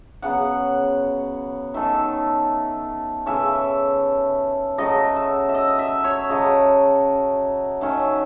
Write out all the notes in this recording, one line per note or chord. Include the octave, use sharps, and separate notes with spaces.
C#3 F#3 B3 F#5
D#3 A3 C#4 E5
C#3 E3 A3 C#4 E5
C#3 F#3 A3 D#5
E5
E5
D#5
E5
C#5
C#3 F#3 A3 D#5
D#3 A3 C#4 E5